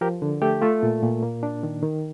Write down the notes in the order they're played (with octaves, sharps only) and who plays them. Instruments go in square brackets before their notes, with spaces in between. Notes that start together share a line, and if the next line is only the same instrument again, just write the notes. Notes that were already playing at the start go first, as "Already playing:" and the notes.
[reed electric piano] F3 G4 A#4
D3
A3 G4
A3 F4
A#2
A#2
A#3
D4
D#3
D#3